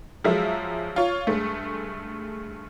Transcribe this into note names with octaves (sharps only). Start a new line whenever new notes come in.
F3 F#3 G#3 E5
F4 C#5
G2 G#3 A3